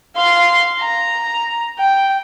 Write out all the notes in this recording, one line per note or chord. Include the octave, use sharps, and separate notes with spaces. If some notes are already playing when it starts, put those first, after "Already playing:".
F5 C6
A#5
G5